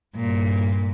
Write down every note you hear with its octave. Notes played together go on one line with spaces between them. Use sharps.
G2 A#2